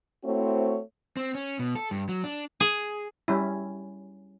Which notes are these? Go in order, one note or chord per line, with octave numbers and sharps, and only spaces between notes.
A3 C4 E4 F#4 C5 C#5
C4
C#4
B2
A4
G2
F#3
D4
G#4
G3 C#4 E4